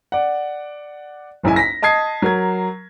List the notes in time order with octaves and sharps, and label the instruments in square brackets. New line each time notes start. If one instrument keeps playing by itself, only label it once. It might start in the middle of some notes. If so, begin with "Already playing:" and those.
[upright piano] D5 F#5
F#1 B1 E4 G#5
A#6 B6
D#5 A5 D#6 G#6 C7
F#3 A#4 G#6